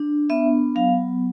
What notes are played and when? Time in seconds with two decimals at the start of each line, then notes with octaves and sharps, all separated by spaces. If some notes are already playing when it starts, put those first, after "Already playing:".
Already playing: D4
0.30 B3 E5
0.75 F#3 F5